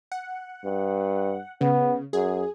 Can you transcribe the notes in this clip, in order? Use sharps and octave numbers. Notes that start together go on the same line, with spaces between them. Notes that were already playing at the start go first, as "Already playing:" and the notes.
F#5
G2
C#3 B3
F#2 G#4